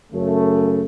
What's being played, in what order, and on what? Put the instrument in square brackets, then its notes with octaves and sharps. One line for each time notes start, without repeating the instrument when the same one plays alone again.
[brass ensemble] F#2 C#3 A3